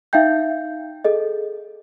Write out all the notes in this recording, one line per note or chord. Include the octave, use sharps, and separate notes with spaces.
D#4 E5 F5 G5 G6
G#4 A4 D#5